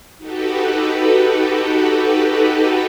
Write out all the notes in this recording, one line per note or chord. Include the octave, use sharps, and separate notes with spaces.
D#4 F#4 G4 A4 B4